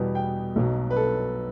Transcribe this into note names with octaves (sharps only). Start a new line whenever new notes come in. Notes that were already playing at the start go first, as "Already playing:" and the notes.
Already playing: E2 B2 G3 B3
G5
B1 B2 F#3
B4
A4